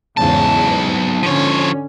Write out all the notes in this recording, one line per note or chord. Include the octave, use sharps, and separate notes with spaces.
B1 E2 G#2 C#3 A5
D3 F3 C#4 C#5